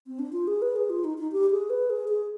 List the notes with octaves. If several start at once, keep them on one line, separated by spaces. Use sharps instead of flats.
C4
D4
F4
G#4
B4
G#4
F4
D#4
D#4
G4
G#4
B4
G#4
G#4